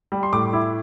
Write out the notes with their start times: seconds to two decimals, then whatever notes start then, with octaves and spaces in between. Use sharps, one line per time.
0.12 G3
0.23 C6
0.33 A2 D6
0.53 E4